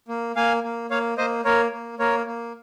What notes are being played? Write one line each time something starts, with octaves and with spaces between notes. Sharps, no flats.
A#3
A#3 F5 G#5
A#3
A#3 C#5 F5
A#3 C5 D#5
A#3 A#4 C#5
A#3
A#3 A#4 C#5
A#3